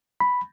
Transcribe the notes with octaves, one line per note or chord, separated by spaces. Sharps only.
B5